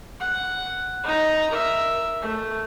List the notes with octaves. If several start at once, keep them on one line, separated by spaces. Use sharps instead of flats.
F#5
D#4 A#5
A#4 E5
A3